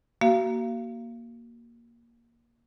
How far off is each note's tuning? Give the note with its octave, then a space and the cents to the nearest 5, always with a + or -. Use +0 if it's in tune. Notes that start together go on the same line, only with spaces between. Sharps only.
A#3 +10 F#4 +30 F5 -30